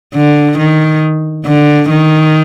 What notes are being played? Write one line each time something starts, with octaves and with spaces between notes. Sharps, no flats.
D3
D#3
D3
D#3